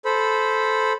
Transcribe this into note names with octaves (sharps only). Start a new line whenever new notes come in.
A4 C5 B5